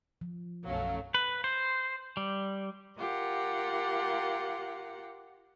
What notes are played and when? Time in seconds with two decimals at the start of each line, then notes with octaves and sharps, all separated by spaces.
0.21 F3
0.66 B1 F#2 F#3 A3 C#4 F5
1.14 B4
1.44 C5
2.17 G3
2.97 F4 G4 A#4 F#5